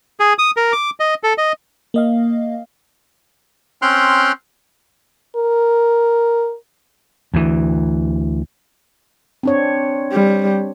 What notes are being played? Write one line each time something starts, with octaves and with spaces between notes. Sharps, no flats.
G#4
D#6
A#4
D6
D#5
A4
D#5
A#3 D#5 F5
C4 C#4 G5 C6 F6 F#6
A#4
D2 E3
C4 D4 C#5
G3